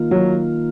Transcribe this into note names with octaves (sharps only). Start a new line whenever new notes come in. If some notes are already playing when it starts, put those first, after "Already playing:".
Already playing: D#3 A#3 F4
F#3